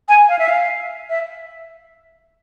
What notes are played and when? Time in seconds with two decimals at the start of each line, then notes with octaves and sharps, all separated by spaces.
0.09 G#5
0.29 F5
0.39 E5
0.49 F5
1.10 E5